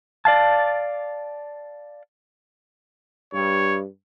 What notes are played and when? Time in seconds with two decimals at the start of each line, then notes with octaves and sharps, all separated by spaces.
0.25 D5 F5 A5
3.34 G2 C#5